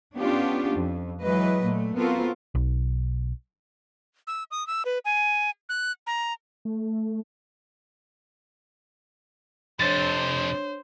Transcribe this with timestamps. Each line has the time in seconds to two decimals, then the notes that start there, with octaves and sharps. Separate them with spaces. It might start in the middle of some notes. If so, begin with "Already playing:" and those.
0.17 B3 C#4 D4 F4 G4
0.76 F2
1.23 E3 F#3 G#3 B4 D#5
1.65 A#2 A3
1.98 B3 C4 F4 F#4 A4 A#4
2.55 B1
4.27 E6
4.51 D#6
4.67 E6
4.85 B4
5.05 G#5
5.69 F#6
6.07 A#5
6.65 A3
9.80 F2 C3 D4 C5 C#5 A6